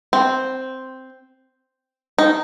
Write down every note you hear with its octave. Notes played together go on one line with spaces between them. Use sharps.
C4
D#4